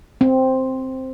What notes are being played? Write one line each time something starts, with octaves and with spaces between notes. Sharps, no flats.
C4